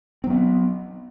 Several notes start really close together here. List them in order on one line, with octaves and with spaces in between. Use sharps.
C4 F#3 B3